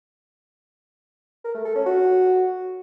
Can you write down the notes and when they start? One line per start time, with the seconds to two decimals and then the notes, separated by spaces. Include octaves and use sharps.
1.44 A#4
1.55 A3
1.65 A4
1.75 C#4
1.86 F#4